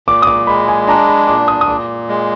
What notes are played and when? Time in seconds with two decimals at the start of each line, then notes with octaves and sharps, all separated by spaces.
0.08 A#2 D6
0.22 D#6
0.27 D6
0.47 G#3 B5
0.68 G#5
0.88 D4 A#5
1.08 B5
1.27 A#2 D6
1.48 D#6
1.61 D#6
1.67 A#2 D6
2.09 G#3